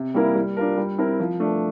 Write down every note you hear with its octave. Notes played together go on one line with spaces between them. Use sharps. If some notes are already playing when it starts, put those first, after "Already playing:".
Already playing: C3
G3 A#3 E4 A#4
G3
D4 F4 A#4
G3
C4 E4 A#4
F3
A3 D4